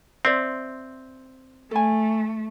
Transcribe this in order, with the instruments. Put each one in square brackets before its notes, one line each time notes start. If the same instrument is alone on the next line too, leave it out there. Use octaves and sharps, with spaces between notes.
[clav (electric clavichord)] C4 [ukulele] C5 D5 E5
[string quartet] A3 [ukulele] A4 G#5